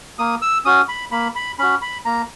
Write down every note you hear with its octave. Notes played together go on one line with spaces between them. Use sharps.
A#3 D#6
E6
C#4 F#4 D#6
B5
A#3 B5
B5
C#4 F#4 B5
B5
A#3 A#5